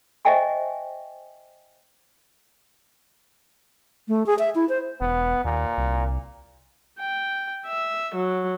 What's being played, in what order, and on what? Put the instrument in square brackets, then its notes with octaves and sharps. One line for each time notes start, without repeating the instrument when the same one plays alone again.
[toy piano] C5 D#5 E5 G5 G#5 C#6
[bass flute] A3
G#4
E5
E4
C5
[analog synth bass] E1 [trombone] B3
[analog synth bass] D#2 [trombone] A#2
[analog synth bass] C2
[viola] G5
E5
F#3